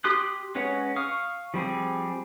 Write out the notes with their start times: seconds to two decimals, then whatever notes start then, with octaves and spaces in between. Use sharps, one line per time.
0.04 G4 C6 D#6 F#6
0.55 G#3 C#4 B4 C#5 F#5
0.96 F5 C#6 D#6 F6
1.54 F3 G3 C4 G#4